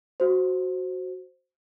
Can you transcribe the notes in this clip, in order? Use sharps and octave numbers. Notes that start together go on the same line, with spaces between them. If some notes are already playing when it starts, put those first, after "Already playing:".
F#4 C5